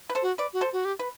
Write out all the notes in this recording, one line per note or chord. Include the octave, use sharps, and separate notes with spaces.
B4
A4 C5
F#4
B4 D5
F#4
A4 C5
F#4
G4
B4